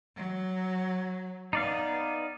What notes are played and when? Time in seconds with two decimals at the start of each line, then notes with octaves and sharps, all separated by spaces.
0.16 F#3
1.53 B3 D#4 D5 F5